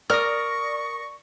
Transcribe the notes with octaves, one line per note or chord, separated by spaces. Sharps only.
A#4 D5 C#6 D#6 F6 A#6